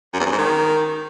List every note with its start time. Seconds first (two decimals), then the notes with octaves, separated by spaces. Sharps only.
0.14 F#2
0.20 E2
0.26 F#2
0.32 G#2
0.38 D#3